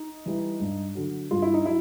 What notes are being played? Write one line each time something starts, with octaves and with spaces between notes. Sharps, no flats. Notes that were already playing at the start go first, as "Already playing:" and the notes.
Already playing: D#4
E3 G3
G2
D3 F#3
G2 F4
E4
D#4
F#3 E4